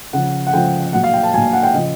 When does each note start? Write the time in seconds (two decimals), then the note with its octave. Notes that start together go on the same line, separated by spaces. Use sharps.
0.13 C#3 F3 F#5
0.47 F#5
0.53 C#3 F3 G5
0.93 A#2 F#3 F#5
1.04 F5
1.14 G5
1.23 A5
1.33 F#3 G#5
1.37 A#2
1.53 F#5
1.63 G5
1.73 C#3 F3 D#5